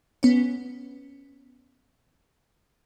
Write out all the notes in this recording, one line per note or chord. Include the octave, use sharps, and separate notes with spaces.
B3 C#4